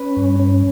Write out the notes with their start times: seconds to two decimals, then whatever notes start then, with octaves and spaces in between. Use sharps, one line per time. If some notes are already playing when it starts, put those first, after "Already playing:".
Already playing: C#4 B4
0.17 G2
0.39 C#4